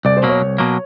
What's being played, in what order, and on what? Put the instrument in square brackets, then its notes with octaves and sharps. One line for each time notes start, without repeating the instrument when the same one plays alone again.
[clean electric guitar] C2 [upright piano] D5
[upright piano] C5
[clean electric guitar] B2 F#3 A#3
[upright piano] C#5
[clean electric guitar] C2
B2 F#3 A#3